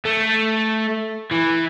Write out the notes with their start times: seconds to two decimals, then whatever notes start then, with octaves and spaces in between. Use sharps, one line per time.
0.05 A3
1.31 E3